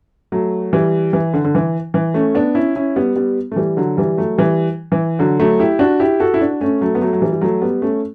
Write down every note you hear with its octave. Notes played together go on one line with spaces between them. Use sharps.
F#3 A3
E3 G3
E3
D3
D3
E3
E3
A3 C#4
B3 D4
C#4 E4
C#4 E4
G3 B3
G3 B3
A3
E3 G3
D3 F#3
E3 G3
F#3 A3
E3 G3
E3
D3 F#3
F#3 A3
E4 G4
D4 F#4
E4 G4
F#4 A4
E4
D4 F#4
A3 C#4
F#3 A3
B3
F#3 A3
F#3
E3 G3
G3
F#3 A3
G3 B3
A3 C#4